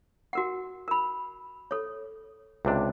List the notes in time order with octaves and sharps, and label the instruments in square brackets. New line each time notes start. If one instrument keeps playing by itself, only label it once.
[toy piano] F#4 A#4 F#5
A#4 B5
A4 C#5
[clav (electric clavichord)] C#2 C3 D4